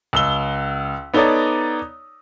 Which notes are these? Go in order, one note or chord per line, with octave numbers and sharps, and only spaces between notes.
C#2 E6 G7
B3 D#4 A4 C#5 D5 A#5